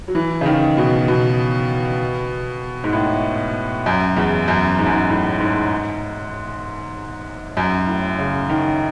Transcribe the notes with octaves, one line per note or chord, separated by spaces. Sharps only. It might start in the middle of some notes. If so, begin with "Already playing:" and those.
F#3
E3
C#3
D#3
B2
B2
G#2
A2
F#2
E2
F#2
G#2
F#2
G#2
A2
G#2
F#2
A2
C#3
D#3